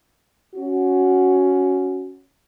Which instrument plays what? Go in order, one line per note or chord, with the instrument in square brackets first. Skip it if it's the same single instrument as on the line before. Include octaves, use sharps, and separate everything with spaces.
[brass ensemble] C#4 F#4